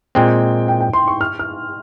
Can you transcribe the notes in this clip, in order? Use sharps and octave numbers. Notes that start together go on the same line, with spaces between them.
A#2 G#3 C4 G5
G5
G5
C6
C#6
F6
F6